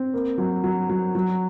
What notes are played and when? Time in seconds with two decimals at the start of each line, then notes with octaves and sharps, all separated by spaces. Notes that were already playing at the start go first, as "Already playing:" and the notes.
Already playing: C4
0.14 A#3
0.38 F#3
0.64 F#3
0.89 F#3
1.15 F#3